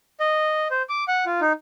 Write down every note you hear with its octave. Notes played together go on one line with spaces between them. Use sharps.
D#5
C5
D6
F#5
F4
D#4